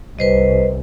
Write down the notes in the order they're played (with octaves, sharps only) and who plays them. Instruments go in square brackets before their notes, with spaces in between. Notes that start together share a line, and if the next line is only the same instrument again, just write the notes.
[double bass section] C2 [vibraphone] B4 C5 D#5